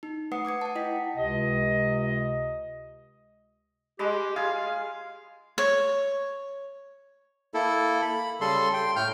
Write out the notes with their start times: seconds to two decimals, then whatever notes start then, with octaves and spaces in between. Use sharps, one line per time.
0.03 D#4
0.31 A3 B4 F#5 D#6 C7 C#7
0.45 D6 D#6 G#6 C#7
0.61 F#5 A5
0.75 E4 D#5 G5 B6
1.17 C#2 C3 D#5
3.99 G#3 G4 B5
4.36 F4 G#4 F5
5.58 C#5
7.54 A#3 E4 A4
8.02 B5
8.41 C#3 G3 A4 C6
8.73 G5 C6
8.96 A2 A3 G5 F6 G6